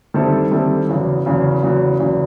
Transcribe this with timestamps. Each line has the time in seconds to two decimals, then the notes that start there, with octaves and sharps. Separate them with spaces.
0.14 D#3 G3 C4 E4 A4
0.51 D#3 G3 C4 E4 A4
0.89 E2 C#3 F#3
1.26 E2 C#3 F#3
1.63 E2 C#3 F#3
2.00 E2 C#3 F#3